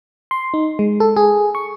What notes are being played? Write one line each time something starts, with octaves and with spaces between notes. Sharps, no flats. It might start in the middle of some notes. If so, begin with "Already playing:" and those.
C6
D#4
G#3
A4
G#4
C#6